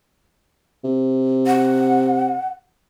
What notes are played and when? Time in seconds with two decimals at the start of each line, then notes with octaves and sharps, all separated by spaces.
0.84 C3
1.47 F#5